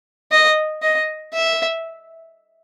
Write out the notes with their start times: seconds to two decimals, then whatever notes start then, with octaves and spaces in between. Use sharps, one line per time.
0.32 D#5
0.82 D#5
1.33 E5